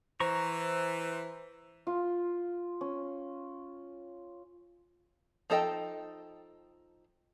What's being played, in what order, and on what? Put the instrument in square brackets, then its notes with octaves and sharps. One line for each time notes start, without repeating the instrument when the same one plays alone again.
[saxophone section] E3 [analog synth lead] C5 [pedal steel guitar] A#5 C#6
[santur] F4
C#4
[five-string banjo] F3 D#4 A4 D#5 G5